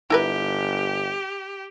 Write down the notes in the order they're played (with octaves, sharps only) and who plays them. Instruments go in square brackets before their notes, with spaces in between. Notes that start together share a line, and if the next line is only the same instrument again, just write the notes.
[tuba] G1 [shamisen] E4 A#4 B4 [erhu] G4